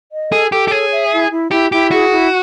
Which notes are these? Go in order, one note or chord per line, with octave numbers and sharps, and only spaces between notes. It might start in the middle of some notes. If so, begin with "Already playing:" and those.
D#5
G#4 A4
G4 A4
G4
G#4 C#5
E5
E4
E4
E4 G4
E4 G4
F#4 G#4
E4